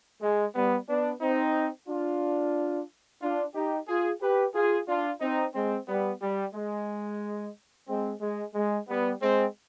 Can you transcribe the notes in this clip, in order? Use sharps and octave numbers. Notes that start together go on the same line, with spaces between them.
G#3
G3 B3
B3 D4
C4 D#4
D4 F4
D4 F4
D#4 G4
F4 G#4
G4 B4
F4 G#4
D4 F4
C4 D#4
G#3 C4
G3 B3
G3
G#3
G#3 C4
G#3
G#3
G3 B3
G#3 C4